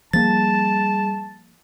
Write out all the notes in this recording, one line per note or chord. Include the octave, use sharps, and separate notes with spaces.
F3 G3 A#3 G#4 A5 A6